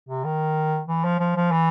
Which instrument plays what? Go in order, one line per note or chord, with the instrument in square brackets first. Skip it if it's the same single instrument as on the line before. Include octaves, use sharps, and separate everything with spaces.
[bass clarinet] C3
D#3
E3
F3
F3
F3
E3